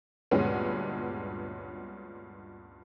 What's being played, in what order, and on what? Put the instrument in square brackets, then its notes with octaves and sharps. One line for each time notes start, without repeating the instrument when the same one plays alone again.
[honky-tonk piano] D2 G2 A#2 G#3 B3 C#4